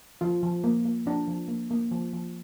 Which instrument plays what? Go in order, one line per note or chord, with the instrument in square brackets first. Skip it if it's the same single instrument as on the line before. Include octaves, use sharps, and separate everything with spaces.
[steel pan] F3 F4
F3
A#3
A#3
F3 D4
F3
A#3
A#3
F3
F3